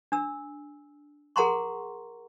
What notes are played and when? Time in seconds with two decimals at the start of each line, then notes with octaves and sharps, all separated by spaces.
0.12 D4 E6
1.36 G#4 A#4 F#5 A#5 C6 C#6